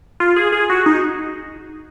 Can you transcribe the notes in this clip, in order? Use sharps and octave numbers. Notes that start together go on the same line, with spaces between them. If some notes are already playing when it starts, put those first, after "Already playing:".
F4
G#4
G#4
F#4
D#4